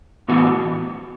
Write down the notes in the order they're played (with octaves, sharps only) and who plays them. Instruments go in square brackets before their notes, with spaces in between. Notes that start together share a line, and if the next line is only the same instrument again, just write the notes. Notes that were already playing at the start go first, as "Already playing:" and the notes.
[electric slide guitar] A2 E3 B3 F#4